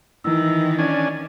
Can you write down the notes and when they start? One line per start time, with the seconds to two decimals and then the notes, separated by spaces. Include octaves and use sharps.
0.24 D#3 E3 E4 E6
0.79 C#4 D4 D5 G#5